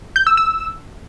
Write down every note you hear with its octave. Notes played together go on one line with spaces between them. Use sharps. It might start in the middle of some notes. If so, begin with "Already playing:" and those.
G6
E6
E6